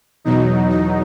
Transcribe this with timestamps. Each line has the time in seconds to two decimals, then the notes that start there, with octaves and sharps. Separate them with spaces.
0.24 E2 B2 F#3 D#4
0.70 D#4